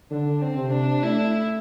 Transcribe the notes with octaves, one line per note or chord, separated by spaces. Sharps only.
D3 D4
C4
C3
D4
A3 E4